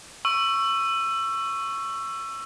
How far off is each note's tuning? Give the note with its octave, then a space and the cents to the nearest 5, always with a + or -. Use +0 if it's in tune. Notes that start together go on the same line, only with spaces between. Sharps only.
C#6 +0 E6 +20